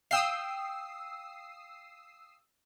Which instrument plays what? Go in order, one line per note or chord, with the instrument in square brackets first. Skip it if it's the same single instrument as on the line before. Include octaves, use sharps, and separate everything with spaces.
[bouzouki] F5 G5 [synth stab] D#6 E6 C7